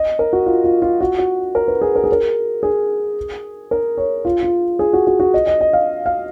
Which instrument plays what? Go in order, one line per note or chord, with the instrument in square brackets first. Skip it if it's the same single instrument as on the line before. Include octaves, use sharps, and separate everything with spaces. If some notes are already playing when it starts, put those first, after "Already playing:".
Already playing: [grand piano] D#5
A#4
F#4
F4
F4
F4
F#4
F#4
A#4
B4
G#4
A#4
G#4
A#4
G#4
A#4
C#5
F4
F4
G#4
F#4
F#4
F#4
D#5
D#5
D#5
F5
F5